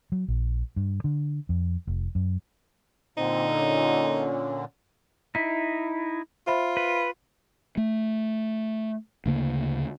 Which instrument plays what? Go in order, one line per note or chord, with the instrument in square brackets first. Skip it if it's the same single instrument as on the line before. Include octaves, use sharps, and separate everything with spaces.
[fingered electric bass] F#3
A#1
G2
D3
F2
F1
F#2
[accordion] A#2 D3 [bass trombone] C4 [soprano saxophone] D#4
[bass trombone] C#4
[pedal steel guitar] D#4 E4 [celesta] B6
[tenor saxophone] F4 [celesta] C5 E5 B5
[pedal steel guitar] B4
[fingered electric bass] A3
D2 C#3 A#3